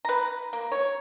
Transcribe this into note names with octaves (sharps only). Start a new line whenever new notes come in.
B4 A#5
A#3
C#5